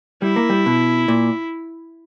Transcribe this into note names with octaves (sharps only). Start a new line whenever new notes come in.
G3 E4
A#3
G3
B2
A#2